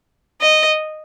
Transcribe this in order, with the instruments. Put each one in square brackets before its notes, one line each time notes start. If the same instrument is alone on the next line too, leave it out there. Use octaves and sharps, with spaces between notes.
[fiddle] D#5